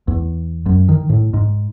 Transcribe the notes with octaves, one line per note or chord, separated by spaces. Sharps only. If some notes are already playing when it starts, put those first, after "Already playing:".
E2
F#2
D#3
A2
G#2